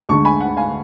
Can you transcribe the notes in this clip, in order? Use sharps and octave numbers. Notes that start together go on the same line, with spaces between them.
D2 D3 G#3 A5 C#6
G#5 B5
F#5
F5 G#5